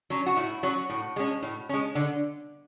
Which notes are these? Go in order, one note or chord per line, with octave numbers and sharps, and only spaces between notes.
F#3 C#4
F#4
A2 E4
F#3 C#4 F#4
A2
G#3 C#4
A2
G#3 C#4
D3